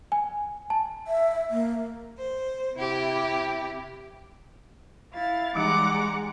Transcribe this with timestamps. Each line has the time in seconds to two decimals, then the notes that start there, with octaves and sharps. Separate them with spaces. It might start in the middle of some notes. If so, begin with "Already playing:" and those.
0.12 G#5
0.70 A5
1.06 E5
1.50 A#3
2.18 C5
2.75 C3 E4 G4
5.13 E4 F5 A6
5.56 E3 G3 G#3 D#4 F#5 A#5 D6